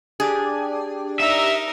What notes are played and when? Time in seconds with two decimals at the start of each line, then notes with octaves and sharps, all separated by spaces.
0.20 D4 G4 G#4 D5
1.20 D#4 A#4 E5